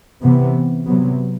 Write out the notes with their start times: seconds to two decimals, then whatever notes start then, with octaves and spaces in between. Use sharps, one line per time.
0.22 C3 E3 B3
0.85 C3 F#3 B3